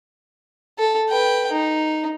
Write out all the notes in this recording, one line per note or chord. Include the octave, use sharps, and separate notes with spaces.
A4
B4 G5
D#4